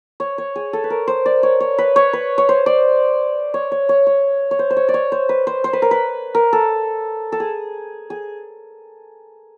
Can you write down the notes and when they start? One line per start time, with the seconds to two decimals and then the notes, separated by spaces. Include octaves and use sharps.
0.20 C#5
0.38 C#5
0.56 G#4
0.73 A4
0.84 B4
0.90 A#4
1.08 C5
1.26 D5
1.43 C#5
1.60 C#5
1.78 B4
1.96 C#5
2.13 B4
2.38 C#5
2.49 C5
2.66 D5
3.54 C#5
3.72 C#5
3.89 C#5
4.07 C#5
4.51 C#5
4.59 C5
4.70 C5
4.77 C#5
4.89 D5
4.94 C#5
5.12 C5
5.29 B4
5.47 C5
5.64 C5
5.73 B4
5.82 A#4
5.91 B4
6.35 A#4
6.53 A4
7.32 A4
7.40 G#4
8.10 G#4